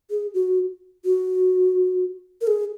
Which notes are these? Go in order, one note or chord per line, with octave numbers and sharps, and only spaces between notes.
G#4
F#4
F#4
A#4
G#4